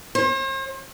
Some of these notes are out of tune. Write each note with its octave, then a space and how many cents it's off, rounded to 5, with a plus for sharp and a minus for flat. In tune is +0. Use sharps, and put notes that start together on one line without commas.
C5 +45